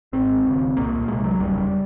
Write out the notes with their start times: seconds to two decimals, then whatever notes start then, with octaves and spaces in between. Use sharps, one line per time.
0.13 G#1 G#2 C4
0.44 E1 D#2 C#3
0.76 C2 A#2 A#3
1.08 C2 C3 G#3
1.23 F#3
1.40 F#1 E2 C#3 G3